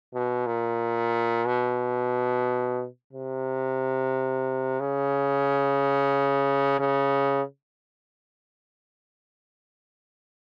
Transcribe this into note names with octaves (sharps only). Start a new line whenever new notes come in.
B2
A#2
B2
C3
C#3
C#3